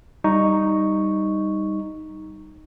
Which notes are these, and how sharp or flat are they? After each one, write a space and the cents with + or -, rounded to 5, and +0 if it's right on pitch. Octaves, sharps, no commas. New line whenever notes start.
G3 +5 D#4 +0 C#6 +0